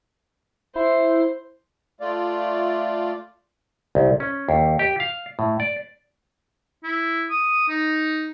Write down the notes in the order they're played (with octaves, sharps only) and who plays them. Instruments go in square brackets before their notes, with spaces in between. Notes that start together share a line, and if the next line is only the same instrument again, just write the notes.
[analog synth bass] E4 [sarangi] C5
[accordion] A3 F4 D5
[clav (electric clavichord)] C2
C#4
D#2
G4
F5
A2
D5
[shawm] E4
D#6
D#4